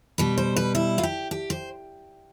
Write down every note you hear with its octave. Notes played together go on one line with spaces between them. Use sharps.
B2 G3 B4
C5
B4
E4
F4
G4
G4
C5